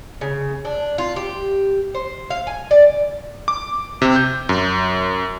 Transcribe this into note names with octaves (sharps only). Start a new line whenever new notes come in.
C#3
D4
F4
G4
C5
F5
G#5
D5
D6
C3
G6
F#2